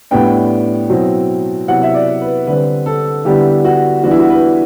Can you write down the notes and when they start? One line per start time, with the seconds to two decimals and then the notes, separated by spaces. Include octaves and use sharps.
0.11 A2 G3 B3 D4 G5
0.90 B2 F#3 C4 E4
1.68 C3 F#3 B3 E4 F#5
1.83 E5
1.94 D5
2.21 B4
2.47 D3 G3 C4 B4
2.86 A4
3.25 D3 G3 B3 E4 G4
3.64 F#4
4.04 E3 G3 B3 D4 F#4
4.11 E4
4.19 F#4
4.30 B4